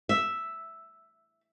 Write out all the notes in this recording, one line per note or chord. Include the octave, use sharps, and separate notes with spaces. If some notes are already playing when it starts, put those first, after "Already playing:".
E5